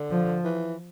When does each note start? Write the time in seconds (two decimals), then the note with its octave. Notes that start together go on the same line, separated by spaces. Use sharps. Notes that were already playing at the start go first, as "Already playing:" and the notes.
Already playing: D3
0.11 F3
0.44 E3